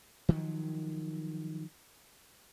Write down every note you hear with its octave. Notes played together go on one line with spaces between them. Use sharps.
D#3 F3 F#3